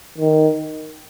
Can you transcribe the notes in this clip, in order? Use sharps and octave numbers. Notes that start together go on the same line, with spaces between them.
D#3